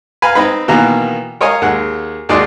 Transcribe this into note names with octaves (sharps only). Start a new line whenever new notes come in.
B4 F5 G#5 A#5
C4 D#4 B4
B2 D#3 E3 A#3 B3 A#5
A#4 C#5 D#5 F5 G#5
D#2 G#3 F#5
D#2 G#3 F#4 D5 D#5 C6